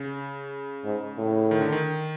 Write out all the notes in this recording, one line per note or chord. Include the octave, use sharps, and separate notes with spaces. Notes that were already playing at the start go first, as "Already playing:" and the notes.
Already playing: C#3
G#2
A2
D#3
D3
D#3